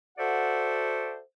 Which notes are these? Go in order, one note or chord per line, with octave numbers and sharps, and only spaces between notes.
F#4 A4 C5 D5 E5 F#5